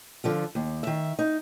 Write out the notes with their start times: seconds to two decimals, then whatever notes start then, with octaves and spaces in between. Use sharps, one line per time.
0.24 D3 F3 F4
0.55 D#2
0.83 D#3 E5
1.19 D#4